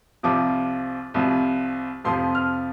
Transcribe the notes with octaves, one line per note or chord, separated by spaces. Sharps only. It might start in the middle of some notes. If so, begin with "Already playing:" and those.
C2 C3 F3 D6
C2 C3 F3
F2 C3 F3 C6
F6